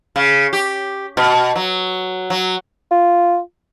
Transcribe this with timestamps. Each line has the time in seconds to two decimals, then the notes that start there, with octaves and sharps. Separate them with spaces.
0.16 C#3
0.53 G4
1.17 B2
1.56 F#3
2.30 F#3
2.91 F4